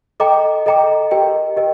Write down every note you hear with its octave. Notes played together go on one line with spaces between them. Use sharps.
A4 D#5 G5 A#5 D6
A4 D#5 G5 A#5 D6
G4 A#4 D#5 G5
G4 A#4 D#5 G5